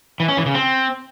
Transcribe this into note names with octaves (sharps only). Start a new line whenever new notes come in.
E3
C#4
E3
C#3
C4